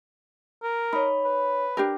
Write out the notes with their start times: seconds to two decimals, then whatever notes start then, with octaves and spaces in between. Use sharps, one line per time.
0.63 A#4
0.93 D#4 C#5 B5
1.25 B4
1.77 D4 G4 A#4